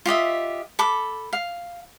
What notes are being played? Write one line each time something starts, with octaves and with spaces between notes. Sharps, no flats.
F4 G4 D#5 E5
A4 B5 D6
F5